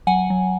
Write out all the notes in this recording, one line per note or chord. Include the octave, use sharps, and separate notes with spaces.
F#3 F#5 G#5
F#3